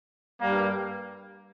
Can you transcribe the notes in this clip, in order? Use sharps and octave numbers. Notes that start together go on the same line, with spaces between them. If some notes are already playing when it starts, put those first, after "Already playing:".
G2 G3 A#3